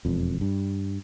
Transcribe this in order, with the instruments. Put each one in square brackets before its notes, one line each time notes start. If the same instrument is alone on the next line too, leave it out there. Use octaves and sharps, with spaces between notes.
[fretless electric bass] E1 F2
G2